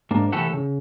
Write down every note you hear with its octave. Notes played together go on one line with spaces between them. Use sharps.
G#2 A#3 D4
C2 E3 A3 G4 A4 F#5
C#3